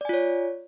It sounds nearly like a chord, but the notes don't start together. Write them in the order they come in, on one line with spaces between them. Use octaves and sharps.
D5 G#5 F4 C#5